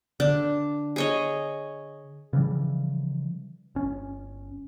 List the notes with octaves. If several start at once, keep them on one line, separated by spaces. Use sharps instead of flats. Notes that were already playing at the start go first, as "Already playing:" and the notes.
D3 D4
G#4 C#5 D#5
C#3 E3 F3 G3
G1 C#4